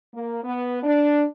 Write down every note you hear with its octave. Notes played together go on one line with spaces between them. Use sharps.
A#3
B3
D4